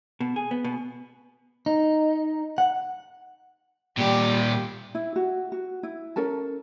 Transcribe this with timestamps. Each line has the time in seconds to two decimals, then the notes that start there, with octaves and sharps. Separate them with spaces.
0.20 B2
0.36 G#4
0.51 B3
0.64 B2
1.66 D#4
2.58 F#5
3.98 A#2 G3 G4
4.95 E4
5.16 F#4
5.52 F#4
5.83 E4
6.16 C#4 A4 A#4 A5